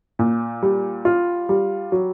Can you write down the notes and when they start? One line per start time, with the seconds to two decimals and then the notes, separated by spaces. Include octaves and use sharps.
0.19 A#2
0.63 G3
1.05 F4
1.49 G3
1.92 F#3